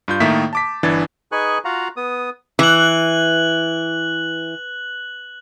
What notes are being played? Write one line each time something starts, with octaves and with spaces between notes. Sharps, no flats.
G2 F4 G6
A2 D#3 A#3 E5 B6
A5 D6 B6
G1 E3 D4 G#6 A6
D#4 G#4 B4 G#5 C#6 F#6
F4 F#4 F5 F#5 A#5
B3 D#6
E3 F#6 F#7